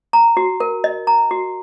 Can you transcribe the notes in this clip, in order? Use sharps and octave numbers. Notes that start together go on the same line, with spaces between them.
A#5
F#4
A#4
D#5
A#5
F#4